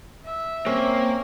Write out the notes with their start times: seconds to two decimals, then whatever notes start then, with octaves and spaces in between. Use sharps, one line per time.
0.25 E5
0.66 A#3 C4 C#4